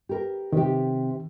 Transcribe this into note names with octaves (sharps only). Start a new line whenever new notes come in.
G4 A#4
C3 D#3 G4